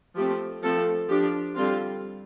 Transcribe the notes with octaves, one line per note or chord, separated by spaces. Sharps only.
F3 A3 C4 G4
F3 A3 C4 A4
F3 D4 G4
D3 G3 C4 F4